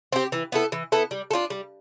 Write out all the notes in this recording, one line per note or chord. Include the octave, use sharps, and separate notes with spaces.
C4 G4
E3
B3 E4 A4
E3
B3 E4 A4
G3
A4
D4 F4
G3